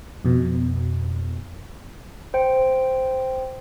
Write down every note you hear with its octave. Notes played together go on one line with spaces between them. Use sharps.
F2 B2
C5 G5